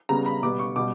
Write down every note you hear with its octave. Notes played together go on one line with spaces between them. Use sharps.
C#3 G3 B3 A#5
B5
B2 G3 B3 D6
C#6
B2 G3 D6